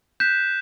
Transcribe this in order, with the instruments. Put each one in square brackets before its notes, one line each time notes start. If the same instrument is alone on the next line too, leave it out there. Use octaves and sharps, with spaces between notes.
[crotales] F#6 B6 E7 [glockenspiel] G6